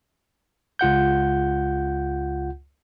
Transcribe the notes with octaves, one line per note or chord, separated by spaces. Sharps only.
C#2 F4 F#5 G6